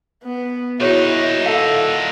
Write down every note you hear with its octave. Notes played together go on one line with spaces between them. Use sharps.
B3
A#2 D#4 E4 F#4 G#4 C#5
A4 F5 F#5